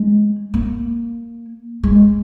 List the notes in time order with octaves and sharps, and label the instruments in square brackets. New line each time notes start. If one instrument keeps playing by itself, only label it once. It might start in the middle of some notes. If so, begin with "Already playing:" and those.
Already playing: [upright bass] G#3
A#3
G#3